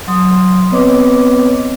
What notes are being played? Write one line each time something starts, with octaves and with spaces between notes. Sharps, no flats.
F#3 C6 D#6
B3 C4 B4 C#5 D#5 D6